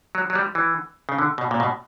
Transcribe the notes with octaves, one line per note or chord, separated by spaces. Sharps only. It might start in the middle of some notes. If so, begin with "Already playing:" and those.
F#3
F#3
G3
E3
C#3
D3
B2
A#2
B2